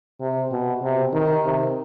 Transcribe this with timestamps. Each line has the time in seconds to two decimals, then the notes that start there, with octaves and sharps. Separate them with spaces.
0.20 C3
0.51 B2
0.82 C3
1.13 D#3
1.45 C3